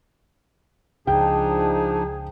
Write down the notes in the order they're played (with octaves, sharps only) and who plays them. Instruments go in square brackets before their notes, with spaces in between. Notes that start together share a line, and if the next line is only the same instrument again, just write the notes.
[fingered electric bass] C#2 [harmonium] F3 D4 D#4 [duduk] G#4 [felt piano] G5